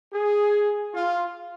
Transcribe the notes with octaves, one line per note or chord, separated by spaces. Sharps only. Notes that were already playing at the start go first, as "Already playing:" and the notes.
G#4
F4